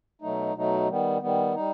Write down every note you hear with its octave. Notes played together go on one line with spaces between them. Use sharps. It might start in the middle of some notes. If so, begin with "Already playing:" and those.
B2 F#3 A3 D#4
B2 F#3 A3 D#4
D#3 G3 B3
D#3 G3 B3
G3 D#4